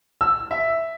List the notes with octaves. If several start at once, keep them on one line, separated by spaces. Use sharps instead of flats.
E6
E5